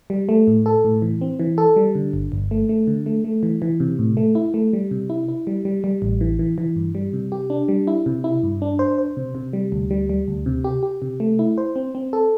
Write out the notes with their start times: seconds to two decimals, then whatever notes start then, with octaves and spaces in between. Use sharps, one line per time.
0.10 G3
0.29 A3
0.47 A2
0.66 A4
0.84 A2
1.02 E3
1.21 C4
1.40 E3
1.58 A4
1.76 G3
1.95 D3
2.13 G1
2.32 G1
2.51 A3
2.69 A3
2.87 D3
3.06 A3
3.24 A3
3.43 E3
3.62 E3
3.80 C3
3.99 A2
4.17 A3
4.35 E4
4.54 A3
4.73 G3
4.91 C3
5.10 E4
5.28 E4
5.47 G3
5.65 G3
5.84 G3
6.02 A1
6.21 E3
6.39 E3
6.58 E3
6.76 G2
6.95 G3
7.13 C3
7.32 G4
7.50 D4
7.68 G3
7.87 E4
8.06 C3
8.24 E4
8.43 G2
8.62 D4
8.79 C5
8.98 C5
9.17 C3
9.35 C3
9.53 G3
9.72 D2
9.91 G3
10.09 G3
10.28 D2
10.46 C3
10.64 G4
10.83 G4
11.02 C3
11.20 A3
11.39 E4
11.58 C5
11.76 C4
11.95 C4
12.13 A4